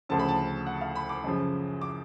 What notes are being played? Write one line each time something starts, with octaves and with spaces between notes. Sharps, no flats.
D2 C#3 F3 A5
B5
A5
F#5
F5
B5
D6
F#2 C#3 F3
D6